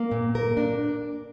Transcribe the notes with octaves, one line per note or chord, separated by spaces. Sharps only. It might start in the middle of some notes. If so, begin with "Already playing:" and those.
Already playing: A#3
A#2
A#4
D4